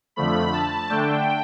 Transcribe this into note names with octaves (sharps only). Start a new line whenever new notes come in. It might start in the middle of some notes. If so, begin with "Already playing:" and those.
F2 D3 F3 A3 B5
A5
D3 A3 D4 G5